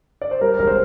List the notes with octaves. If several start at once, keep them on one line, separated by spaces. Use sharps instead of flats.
D5
C5
G3 A#4
E1 A#4
C5